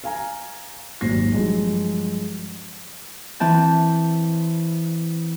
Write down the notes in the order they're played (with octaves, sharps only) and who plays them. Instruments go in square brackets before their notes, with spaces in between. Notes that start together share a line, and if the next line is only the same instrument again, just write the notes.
[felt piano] F5 G#5 A#5
G#1 D#2 A#2 F#3 A#6 C7
G2 F3 F#3 G#3
[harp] E3 C4 A5 F#6 G6